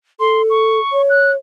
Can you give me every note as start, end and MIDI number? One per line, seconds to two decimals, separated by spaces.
0.20 0.79 69
0.20 0.42 84
0.50 1.02 85
0.93 1.36 73
1.10 1.31 90